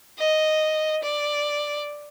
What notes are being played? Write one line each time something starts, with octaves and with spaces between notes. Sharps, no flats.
D#5
D5